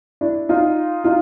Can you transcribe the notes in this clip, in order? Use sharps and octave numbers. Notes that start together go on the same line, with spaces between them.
D4 E4
D#4 F4
D#4 F4